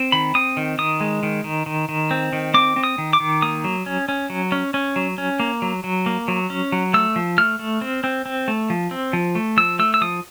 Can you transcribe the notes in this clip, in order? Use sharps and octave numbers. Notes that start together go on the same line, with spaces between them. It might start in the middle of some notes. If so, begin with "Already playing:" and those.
Already playing: C4
D#3 B5
C4 D#6
D#3
D#3 D#6
G#3
D#3
D#3
D#3
D#3
C4
D#3
C4 D6
C4
D#6
D#3
D6
D#3
A#3 D#6
F#3
C#4
C#4
F#3
C#4
C#4
F#3
C#4
A#3
F#3
F#3
A#3
F#3
C#4
F#3
A3 E6
F3
A3 F6
A3
C4
C4
C4
A3
F3
C4
F3
A3
F3 E6
A3 E6
E6
F3 D#6